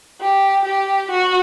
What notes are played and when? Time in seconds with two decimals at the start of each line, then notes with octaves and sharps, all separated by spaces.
0.21 G4
0.65 G4
1.11 F#4